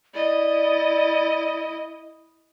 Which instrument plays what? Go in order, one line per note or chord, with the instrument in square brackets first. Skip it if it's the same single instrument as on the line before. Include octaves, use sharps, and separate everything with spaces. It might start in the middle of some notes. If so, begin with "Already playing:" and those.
[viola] E4 D#5 [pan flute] D5